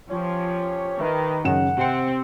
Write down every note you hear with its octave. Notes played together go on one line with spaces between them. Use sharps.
F3 C#4 G4 C#5
D#3 D#4 G4 B4 E5
F#2 C#3 F#5 E7
C3 C4 C#7